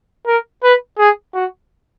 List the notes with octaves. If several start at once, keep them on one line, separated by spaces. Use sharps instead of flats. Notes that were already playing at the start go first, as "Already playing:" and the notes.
A#4
B4
G#4
F#4